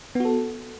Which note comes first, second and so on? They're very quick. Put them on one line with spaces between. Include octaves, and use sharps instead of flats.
B3 F#4 A4